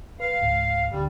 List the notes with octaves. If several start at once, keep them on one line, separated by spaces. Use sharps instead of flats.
B4 F5
C#2 G#2
D2 D3 G3